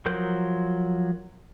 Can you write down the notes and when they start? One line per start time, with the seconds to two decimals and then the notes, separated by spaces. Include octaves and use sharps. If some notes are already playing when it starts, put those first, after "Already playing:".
0.06 F3 F#3 A#4 G6